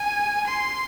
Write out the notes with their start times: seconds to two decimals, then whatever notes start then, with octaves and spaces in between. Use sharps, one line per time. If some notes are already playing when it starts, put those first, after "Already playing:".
Already playing: G#5
0.47 C6